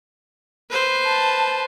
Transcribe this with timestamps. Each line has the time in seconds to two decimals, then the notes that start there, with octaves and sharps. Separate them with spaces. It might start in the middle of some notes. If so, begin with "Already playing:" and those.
0.70 B4 C5
1.07 A5